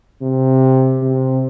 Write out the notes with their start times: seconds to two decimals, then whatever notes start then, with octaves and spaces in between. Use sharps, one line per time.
0.22 C3
1.02 C3